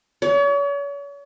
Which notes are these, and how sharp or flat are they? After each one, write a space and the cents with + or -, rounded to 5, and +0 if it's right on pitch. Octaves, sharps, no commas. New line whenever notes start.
C#5 +40